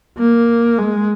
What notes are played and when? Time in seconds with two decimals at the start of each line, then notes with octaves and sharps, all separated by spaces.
0.18 A#3
0.78 G#3